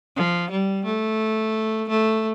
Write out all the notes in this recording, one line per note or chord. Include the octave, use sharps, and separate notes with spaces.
F3
G3
A3
A3